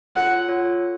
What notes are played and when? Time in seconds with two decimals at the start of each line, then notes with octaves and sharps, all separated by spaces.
0.16 F4 A4 C#5 F#5
0.48 F4 A4 C#5